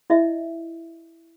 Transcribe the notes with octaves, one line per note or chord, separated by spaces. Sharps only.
E4 D#5 E5